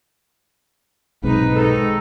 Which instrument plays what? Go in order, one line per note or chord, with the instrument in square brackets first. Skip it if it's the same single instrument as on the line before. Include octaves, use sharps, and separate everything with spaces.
[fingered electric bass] B1 C3 [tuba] G#2 [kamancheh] D#4 B4
[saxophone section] D#3 A4 [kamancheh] D#4